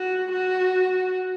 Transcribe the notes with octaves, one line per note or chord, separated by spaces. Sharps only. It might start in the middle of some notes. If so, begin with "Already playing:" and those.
Already playing: F#4
F#4